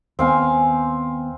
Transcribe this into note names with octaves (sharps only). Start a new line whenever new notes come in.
D#2 B3 C4 F5 G#5